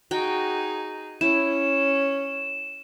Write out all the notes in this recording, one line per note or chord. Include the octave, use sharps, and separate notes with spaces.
D#4 F#4 G#4 G5
C#4 E4 E7